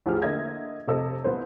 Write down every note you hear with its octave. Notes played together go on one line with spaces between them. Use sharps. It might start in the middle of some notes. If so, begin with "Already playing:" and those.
A1 E2 F3 G4 G#4 F6
D3 A#3 D#5 E5 G#6 A#6
F1 C3 A4 D#5 E6
C2 B3 C5